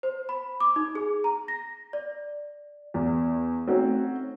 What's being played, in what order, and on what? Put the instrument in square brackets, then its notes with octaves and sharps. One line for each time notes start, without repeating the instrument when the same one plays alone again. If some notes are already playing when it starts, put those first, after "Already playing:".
[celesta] C5
B5
D6
D#4
G#4
A#5
A#6
D5
[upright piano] E2
A3 C4 C#4 D#4 F#4